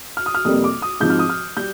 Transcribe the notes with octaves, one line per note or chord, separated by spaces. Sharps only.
F6
D#6
F6
F2 C3 G3 A#3 D#6
D6
D#6
G#2 F3 C4 G6
F6
D#6
F6
G3 G6